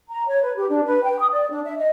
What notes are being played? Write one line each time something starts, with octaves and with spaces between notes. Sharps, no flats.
A#5
C#5
B4
G4
D4
B4
G5
D#6
D5
D4
E5
D#5